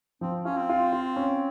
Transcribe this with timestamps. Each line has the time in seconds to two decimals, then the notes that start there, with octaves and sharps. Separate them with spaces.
0.21 F3 C4
0.45 C#4 F4
0.57 C4
0.69 F4
0.93 F4
1.16 C#4